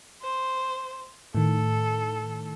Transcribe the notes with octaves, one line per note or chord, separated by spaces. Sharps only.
C5
A2 D#3 A4